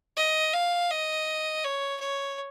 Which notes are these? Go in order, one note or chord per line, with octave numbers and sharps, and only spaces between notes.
D#5
F5
D#5
C#5
C#5